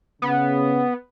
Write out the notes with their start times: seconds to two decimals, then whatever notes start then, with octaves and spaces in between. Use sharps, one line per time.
0.22 C#3 B3